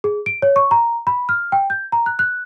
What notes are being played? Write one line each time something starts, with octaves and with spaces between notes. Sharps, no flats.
G#4
D7
C#5
C#6
A#5
B5
F6
G5
G6
A#5
F#6
F#6